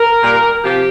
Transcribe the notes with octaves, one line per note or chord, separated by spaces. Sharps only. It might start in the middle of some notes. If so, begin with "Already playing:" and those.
Already playing: A#4
A#2 G3
C3 F3 G4